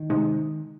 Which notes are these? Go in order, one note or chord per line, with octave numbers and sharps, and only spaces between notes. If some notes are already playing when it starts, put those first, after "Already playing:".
Already playing: D#3
C3 G#3 D#4